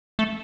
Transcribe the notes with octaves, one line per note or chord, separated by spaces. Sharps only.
A3